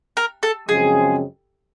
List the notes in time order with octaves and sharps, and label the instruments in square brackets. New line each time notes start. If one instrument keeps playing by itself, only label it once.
[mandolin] A#4
A4
[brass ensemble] F#2 C#3 F3 G#3 C4 [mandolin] G#4